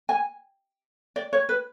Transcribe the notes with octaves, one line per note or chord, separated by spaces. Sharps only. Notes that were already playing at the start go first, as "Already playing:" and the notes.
G#5
D5
C#5
B4